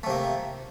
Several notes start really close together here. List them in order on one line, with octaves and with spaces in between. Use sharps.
A3 C3 A#3